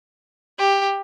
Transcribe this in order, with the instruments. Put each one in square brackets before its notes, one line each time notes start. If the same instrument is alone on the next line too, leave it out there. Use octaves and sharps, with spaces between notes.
[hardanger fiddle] G4